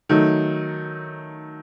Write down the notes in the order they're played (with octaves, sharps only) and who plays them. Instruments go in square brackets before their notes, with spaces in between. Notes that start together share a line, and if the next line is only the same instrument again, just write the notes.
[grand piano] D#3 F#3 A3